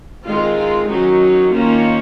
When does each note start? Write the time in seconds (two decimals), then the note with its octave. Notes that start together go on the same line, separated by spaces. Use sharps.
0.25 D#3 G#3 C4 F4
0.57 F4
0.89 D#3 F#3 C#4 D#4
1.21 D#4
1.53 D#3 A#3 C#4 F4